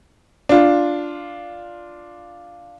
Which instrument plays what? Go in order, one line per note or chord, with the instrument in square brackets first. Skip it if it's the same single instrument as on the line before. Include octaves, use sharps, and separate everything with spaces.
[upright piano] D4 F4